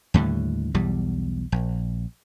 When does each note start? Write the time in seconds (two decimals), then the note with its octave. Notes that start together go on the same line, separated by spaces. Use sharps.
0.14 D#2 A2 D3 G3
0.75 B1 E2 G3
1.52 A#1